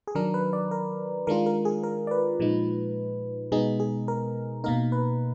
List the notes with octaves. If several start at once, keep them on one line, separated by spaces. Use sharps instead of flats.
G#4
D#3 F#3 D4 A#4
B4
D5
A#4
D#3 G#3 D4 F4 A#4
A#4
G#4
A#4
D5
B4
A#2 F3 G#3 D#4
B2 G#3 B3 D#4 G#4
G#4
A#4
B2 A#3 D#4 A#4
B4